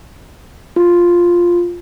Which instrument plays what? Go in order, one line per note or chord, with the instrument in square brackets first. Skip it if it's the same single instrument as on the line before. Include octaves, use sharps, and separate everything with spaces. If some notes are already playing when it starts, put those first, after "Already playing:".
[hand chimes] F4